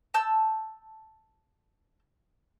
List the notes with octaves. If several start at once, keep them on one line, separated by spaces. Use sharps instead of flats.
A5 E6 G6